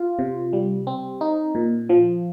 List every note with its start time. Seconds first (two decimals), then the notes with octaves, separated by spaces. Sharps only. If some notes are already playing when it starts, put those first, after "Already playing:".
Already playing: F4
0.19 C3
0.53 G3
0.87 C4
1.21 D#4
1.55 A#2
1.89 F3